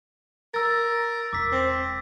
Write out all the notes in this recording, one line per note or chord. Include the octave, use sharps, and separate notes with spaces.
A#4 E6 A6
E1 D6 E6 B6
C4